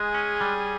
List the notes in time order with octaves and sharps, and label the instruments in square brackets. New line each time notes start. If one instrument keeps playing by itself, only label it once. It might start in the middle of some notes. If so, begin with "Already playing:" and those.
Already playing: [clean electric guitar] G#3 [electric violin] G#4
[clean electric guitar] C#4
G3